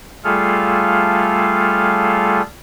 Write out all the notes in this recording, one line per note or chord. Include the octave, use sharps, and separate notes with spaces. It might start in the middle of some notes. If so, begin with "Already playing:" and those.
G3 A3 F4 G#4 A4 F5